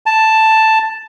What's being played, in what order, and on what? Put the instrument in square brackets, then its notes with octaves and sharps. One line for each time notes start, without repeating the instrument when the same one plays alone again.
[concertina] A5